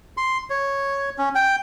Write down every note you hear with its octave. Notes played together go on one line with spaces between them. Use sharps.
C6
C#5
C#4
G5